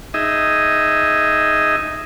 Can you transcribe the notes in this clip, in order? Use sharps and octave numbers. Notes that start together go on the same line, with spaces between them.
D#4 G#4 D#5 E5